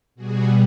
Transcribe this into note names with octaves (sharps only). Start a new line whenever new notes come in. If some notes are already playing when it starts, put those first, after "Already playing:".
B2 G3 F#4 G#4